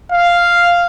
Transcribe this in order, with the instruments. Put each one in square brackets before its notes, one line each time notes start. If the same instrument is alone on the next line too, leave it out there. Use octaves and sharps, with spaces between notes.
[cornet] F5